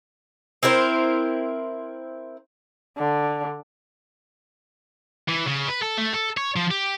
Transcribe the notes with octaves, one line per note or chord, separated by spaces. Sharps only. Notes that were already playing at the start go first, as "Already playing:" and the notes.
C4 E4 A#4 C5
D3
E3
C#3
B4
A4
A3
A4
C#5
F3
G4